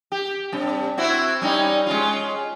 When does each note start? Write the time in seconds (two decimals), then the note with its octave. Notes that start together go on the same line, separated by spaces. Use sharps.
0.12 G4
0.52 G2 C3
0.98 C4 E4 F#4
1.41 G3 C#4 D#4
1.87 G#3 C#4 F4